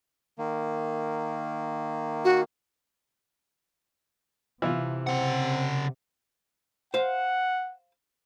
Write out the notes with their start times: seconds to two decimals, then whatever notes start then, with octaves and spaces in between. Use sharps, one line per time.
0.39 D#3 A#3
2.25 F#4
4.62 C3 E3 E4 F4
5.07 C#3 C4 F#5
6.94 C5 F5 F#5